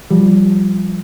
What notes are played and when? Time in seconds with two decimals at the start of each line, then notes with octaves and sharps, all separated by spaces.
0.10 F3 G3